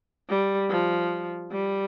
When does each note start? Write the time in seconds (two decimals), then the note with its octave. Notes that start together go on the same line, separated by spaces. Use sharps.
0.29 G3
0.70 F3
1.52 G3